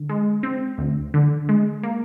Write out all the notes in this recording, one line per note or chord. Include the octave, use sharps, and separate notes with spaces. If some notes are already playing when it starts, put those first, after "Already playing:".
Already playing: D3
G#3
C4
D2
D3
G#3
A#3